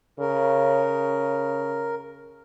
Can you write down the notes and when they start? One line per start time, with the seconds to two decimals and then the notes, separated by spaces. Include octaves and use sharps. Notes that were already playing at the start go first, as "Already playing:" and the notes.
0.19 C#3 A#4